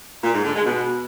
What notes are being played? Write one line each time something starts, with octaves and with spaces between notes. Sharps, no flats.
A#2
G#2
D3
G#3
B2